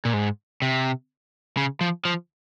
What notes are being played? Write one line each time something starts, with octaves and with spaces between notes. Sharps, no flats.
A#2
G#2
C3
C#3
F3
F3